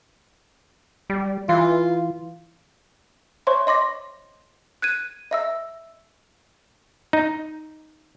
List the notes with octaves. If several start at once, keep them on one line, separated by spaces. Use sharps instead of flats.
G3
E3 F4
C5 C#5 E5 C6 C#6
D#5 C6 D6 A#6
F#6 G#6 D#7
D#5 E5 E6
D#4